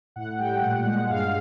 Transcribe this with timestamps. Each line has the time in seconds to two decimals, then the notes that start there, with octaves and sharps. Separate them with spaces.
0.16 A2 F#5
0.39 G3 G5
0.62 A#2 F#5
0.86 G#3 F#5
1.10 G2 F5